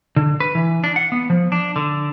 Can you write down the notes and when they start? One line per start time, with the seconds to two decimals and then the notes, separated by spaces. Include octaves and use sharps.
0.16 D3
0.40 B4
0.55 E3
0.84 D4
0.96 F#5
1.12 B3
1.30 F3
1.52 D4
1.76 D3